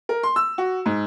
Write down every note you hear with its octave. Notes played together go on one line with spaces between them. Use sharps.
A#4
C6
E6
F#4
G#2